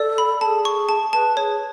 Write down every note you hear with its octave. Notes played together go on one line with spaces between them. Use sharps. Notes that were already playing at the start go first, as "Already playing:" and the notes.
Already playing: A4 D5
B5
G#4 A4 A5
C#6
A5
B4 A5
G#4 C#5